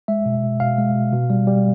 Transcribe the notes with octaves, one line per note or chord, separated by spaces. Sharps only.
G#3 E5
B2
B2
B2 F5
G#3
B2
B2
G3
G3